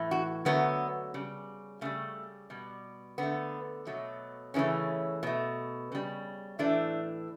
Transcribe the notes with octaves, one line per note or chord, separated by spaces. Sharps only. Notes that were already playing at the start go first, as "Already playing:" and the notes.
Already playing: A2 E3 A3
F#4
D3 F#3 A3 B3
C#3 G3
C#3 G3 A3
B2 G3
D3 A3 B3
B2 F#3 A3
C#3 E3 A3 C#4
B2 A3
C#3 G3
A2 E3 A3 D4